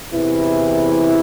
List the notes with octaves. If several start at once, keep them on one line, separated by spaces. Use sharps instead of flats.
E2 C3 E3 E4